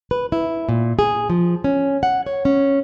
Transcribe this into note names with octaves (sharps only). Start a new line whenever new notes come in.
B4
E4
A#2
G#4
F3
C#4
F#5
C#5
C#4